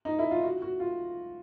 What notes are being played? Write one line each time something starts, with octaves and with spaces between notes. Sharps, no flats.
D#4
E4
F4
F#4
F#4
F4